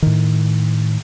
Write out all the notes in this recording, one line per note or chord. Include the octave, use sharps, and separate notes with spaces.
A2 D#3